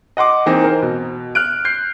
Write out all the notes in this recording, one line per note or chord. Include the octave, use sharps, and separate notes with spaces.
D#5 F#5 C6 D6
E3 A#3 C4 D#4
A#4 C5
B2
F6 F#6 D7
G6 C7